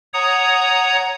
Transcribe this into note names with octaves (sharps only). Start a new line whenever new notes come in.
C#5 F#5 A#5 D#6